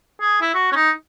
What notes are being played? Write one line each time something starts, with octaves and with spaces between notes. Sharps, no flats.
G#4
E4
F#4
C#4
D#4